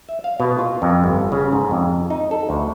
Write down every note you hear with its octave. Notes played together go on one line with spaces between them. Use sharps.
E5
F5
B2
F4
F2
G1
C#3
G#2
F2
D#4
A4
D2